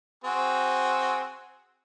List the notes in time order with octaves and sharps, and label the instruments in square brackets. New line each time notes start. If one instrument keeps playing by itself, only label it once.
[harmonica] C4 F#4 G#4